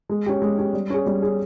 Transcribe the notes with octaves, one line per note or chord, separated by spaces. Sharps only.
G#3
C#4 G4
G#3
C#4 G4
G3
C#4 G#4
G3
C#4 G#4